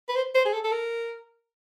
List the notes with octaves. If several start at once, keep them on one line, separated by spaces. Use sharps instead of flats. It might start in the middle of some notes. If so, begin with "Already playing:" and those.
B4
C5
C5
G#4
A4
A4
A#4